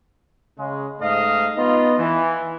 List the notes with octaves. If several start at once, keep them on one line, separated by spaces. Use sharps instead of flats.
C#3 G#3
G#2 A3 D#5 F5
B3 D#4 F4 D#5
E3